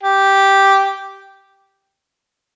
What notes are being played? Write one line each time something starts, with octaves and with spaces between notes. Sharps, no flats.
G4